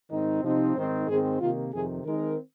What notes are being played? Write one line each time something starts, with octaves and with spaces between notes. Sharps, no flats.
G#2 D#3 C4 D#4
C3 F3 C4 D#4
G#2 D#3 C4 D#4 C5
G#2 D#3 G#3 C4 G#4
C3 D#3 A#3 F4
F2 C3 D#3 G#4
D#3 G#3 C4 D#4 A#4